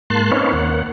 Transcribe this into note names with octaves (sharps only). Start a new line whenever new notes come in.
G#2 A#3 A5 C6 F#6
C4 C#4 D#4 B4 C#5 F5
D#2 A#3 F#5